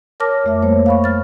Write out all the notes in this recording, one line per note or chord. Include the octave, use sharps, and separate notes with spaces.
A#4 C#5 A5 D6 F6 A#6
F2 A3 E5
G3 A#3 C5 C#5
F5 B5 C#6
G3 F6 A6